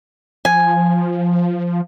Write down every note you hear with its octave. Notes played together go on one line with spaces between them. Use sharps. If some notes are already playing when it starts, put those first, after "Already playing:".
F3 G#5